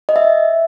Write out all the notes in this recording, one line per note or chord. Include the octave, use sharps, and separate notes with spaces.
D#5
E5